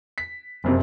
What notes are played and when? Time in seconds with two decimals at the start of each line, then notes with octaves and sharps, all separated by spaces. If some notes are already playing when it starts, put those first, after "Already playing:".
0.18 B6
0.64 F#1 F2 C3